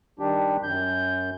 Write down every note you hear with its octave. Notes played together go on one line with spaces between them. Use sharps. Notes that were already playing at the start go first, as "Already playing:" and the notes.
D#3 G3 D4 G4
F#2 G6